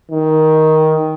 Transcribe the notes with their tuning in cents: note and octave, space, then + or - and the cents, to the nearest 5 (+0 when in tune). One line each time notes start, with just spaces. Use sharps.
D#3 +10